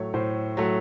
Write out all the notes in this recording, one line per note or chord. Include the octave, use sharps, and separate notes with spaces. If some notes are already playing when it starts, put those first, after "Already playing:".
Already playing: A2 F#3 A3 C#5
A2 C5
F#3 A3